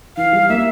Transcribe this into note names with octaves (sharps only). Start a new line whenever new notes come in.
E3 F5
G3
A#3 E5